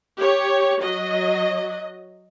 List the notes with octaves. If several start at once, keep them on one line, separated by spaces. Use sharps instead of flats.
G4 C#5
F#3 D#5